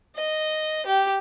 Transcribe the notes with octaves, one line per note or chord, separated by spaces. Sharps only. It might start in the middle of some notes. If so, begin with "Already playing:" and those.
D#5
G4